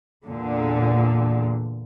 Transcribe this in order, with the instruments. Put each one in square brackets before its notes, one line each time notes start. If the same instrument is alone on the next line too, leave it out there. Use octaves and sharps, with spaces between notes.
[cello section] E2 A#2 D3